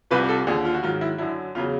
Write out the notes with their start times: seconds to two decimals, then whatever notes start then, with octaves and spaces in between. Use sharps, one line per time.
0.11 C2 C3 F3 B4
0.29 A4
0.47 D#2 D3 F3 G#4
0.65 F4
0.74 F#4
0.83 G#2 D#3 F#3 F4
1.01 E4
1.18 F#2 D3 F#3 E4
1.55 E2 C#3 F#3 F4